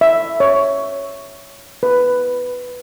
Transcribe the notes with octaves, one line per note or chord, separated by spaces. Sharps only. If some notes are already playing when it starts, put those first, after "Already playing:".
E5
C#5
B4